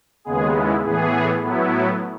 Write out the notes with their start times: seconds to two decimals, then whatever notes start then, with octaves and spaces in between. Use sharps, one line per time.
0.25 D#2 C#3 G#3 B3 G#4
0.54 E4
0.83 A2 E3 B3 G#4
1.42 A2 F#3 B3 E4